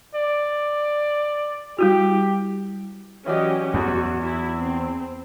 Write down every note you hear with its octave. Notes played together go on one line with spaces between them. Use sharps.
D5
G3 E4 F#4 G4
E3 F#3 C#4 G4 D5 D#5
E2 F#4
E4
C4